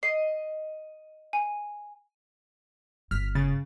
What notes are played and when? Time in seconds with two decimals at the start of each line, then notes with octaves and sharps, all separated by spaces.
0.03 D#5 C7
1.33 G#5
3.11 G1 F6 B6
3.35 C#3 A6